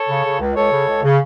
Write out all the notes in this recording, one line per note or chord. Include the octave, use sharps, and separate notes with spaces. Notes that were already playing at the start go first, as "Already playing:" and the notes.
Already playing: A4 C#5
C#3
C#3
C#2
C#2 A4 C#5
C#3
C#2
C#3